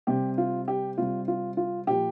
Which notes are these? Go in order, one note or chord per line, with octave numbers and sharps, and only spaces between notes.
C3 G3 G4
F4
G4
C3 G3 F4
F4
F4
A#2 F3 G4